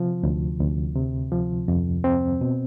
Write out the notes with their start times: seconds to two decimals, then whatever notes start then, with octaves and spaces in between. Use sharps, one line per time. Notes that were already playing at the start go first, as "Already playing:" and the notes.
Already playing: C3 F3
0.23 D2
0.60 D2
0.96 C3
1.32 F3
1.68 F2
2.04 C4
2.41 B2